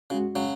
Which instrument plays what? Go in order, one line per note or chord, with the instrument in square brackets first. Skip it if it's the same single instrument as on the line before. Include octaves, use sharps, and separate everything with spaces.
[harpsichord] C#3 [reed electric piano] G#3 C#4 F#4
[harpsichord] C#3 F#3